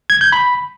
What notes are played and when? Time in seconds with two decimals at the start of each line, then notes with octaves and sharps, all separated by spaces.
0.10 G#6
0.21 G6
0.32 B5